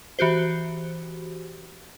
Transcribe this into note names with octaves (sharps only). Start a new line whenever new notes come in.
E3 F#4 G4 C5